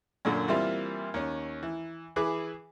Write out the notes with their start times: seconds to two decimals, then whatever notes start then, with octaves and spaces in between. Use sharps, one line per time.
0.25 F#2 A#2 D3
0.48 E3 G3 A#3 C4 E4 F4
1.14 D#2 C#4
1.63 E3
2.16 E3 G#4 B4 D6